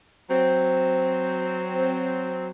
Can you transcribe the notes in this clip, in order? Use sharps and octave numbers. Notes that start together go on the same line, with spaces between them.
F#3 C4